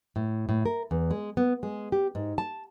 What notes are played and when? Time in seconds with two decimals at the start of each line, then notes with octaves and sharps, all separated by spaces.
0.16 A2
0.49 A2
0.66 A#4
0.91 E2
1.11 G#3
1.37 B3
1.63 G#3
1.92 G4
2.15 G#2
2.38 A5